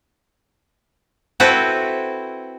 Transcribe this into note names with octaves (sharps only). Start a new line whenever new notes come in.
C4 E4 F#4 A4 B4